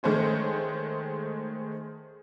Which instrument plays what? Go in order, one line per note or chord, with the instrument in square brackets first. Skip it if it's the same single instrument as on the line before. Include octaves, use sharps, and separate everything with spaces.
[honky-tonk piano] D#3 G#3 A3 C5 C#5